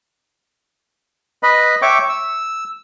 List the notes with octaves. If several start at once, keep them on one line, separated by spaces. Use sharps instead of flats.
B4 D#5 B5
C#5 E5 G5 C#6 D6
E6